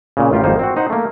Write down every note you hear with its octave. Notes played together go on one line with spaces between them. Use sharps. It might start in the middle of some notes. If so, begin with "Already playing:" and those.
A#2 C#3
A1 G3 F4 G4 A#4
G#1 F2 A#3 D#4 C5
C4 F#4
D#4 C5 F#5
A3 A#3